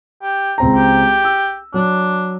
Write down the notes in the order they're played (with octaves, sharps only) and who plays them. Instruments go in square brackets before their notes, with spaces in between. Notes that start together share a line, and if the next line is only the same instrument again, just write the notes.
[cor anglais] G4
[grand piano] C#2 C4 A#5
[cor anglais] G4
[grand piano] E6
[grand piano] F#3 [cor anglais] D4